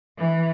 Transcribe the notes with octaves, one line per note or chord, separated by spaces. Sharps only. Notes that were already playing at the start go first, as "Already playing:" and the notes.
E3